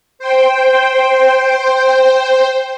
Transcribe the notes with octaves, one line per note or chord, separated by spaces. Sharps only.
C5 G5